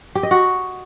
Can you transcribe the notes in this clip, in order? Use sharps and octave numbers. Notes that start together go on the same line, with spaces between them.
G4
D#5
F#4